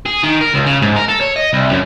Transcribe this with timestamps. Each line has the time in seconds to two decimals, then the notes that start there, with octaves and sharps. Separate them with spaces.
0.06 G#4
0.24 D#3
0.41 A#4
0.54 C#2
0.66 C#3
0.82 G#2
0.96 A#4
1.08 A4
1.21 C#5
1.36 D#5
1.53 C2
1.71 F#2